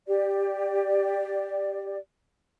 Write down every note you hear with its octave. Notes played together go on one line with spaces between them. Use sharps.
G4 D5